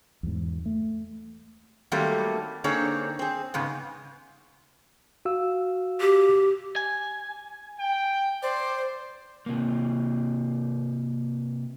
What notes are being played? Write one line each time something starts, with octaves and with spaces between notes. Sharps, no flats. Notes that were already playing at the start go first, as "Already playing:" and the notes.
E2 G#2
A3
D#3 F#3 G3 A3 A#3 C4
D3 A#3 C4 D#4 G#4 C#5
C4 G#4
G#2 C#3 G#3 B3
F#4 F5 E6
G4
G#5
G5
C5 D5
C3 A#3